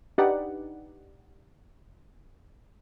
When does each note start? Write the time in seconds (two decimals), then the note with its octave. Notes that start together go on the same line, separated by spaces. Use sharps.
0.18 D4 D#4 G4 B4 D5 F#5